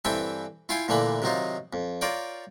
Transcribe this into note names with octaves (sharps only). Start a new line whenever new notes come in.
G2 E3 C4 A4 E5 G5
E4 F4 F5 G5 G#5 C6
A#2 D3 E3 A3 A#3 B5
C3 D#3 F#3 D#4 F4
F2
F4 A#4 C#5 D5 G5